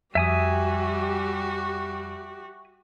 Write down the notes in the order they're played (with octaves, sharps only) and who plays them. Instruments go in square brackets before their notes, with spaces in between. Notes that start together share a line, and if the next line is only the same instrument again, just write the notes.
[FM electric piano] F2 [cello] G3 [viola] F#4 G4 [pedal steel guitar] E5 G#5 D#6